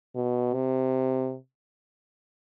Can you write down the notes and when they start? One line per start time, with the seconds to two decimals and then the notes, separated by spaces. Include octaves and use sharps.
0.16 B2
0.54 C3